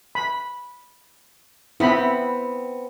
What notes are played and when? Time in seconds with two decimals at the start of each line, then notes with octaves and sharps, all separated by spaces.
0.15 B5
1.80 B3 C4 E4 B5